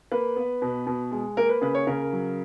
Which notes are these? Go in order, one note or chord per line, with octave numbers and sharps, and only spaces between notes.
A#3 B4
B3
B2
B2
G#3
A#3 A#4
B4
C#3 B4
C#5
C#3 A#4
F#3